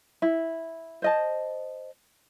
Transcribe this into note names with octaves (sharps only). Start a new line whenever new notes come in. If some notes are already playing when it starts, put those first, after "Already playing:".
E4
C5 D#5 A5